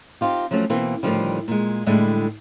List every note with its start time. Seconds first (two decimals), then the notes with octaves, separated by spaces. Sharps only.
0.21 C4 D#4 F4 G4
0.51 F3 F#3 A3 C#4 F#4
0.70 B2 E3 A#3 C4 F4
1.03 A2 D3 D#3 F3 G3
1.48 A#2 G#3
1.87 A2 D3 G3 G#3 E4